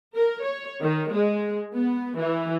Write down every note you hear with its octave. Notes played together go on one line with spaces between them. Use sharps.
A#4
C#5
D#3
G#3
B3
E3